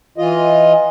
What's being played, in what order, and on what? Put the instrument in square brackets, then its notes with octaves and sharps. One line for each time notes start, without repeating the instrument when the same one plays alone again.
[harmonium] E3 F4 D#5